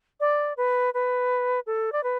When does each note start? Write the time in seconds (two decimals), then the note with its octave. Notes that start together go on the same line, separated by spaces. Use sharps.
0.20 D5
0.57 B4
0.94 B4
1.67 A4
1.92 D5
2.03 B4